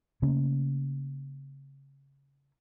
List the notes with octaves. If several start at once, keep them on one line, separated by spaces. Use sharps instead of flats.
C#3 A3 A#3 C#4